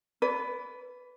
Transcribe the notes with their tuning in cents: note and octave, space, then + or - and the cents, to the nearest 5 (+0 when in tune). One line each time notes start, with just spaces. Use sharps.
B4 +10 D5 -30